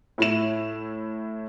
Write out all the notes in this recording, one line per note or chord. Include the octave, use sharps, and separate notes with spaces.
A2 E4 E7